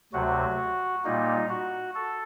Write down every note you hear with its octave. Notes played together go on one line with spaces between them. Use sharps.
D2 C3 F#3 F#4
A#2 G3 A#3 D#4
F#4
A4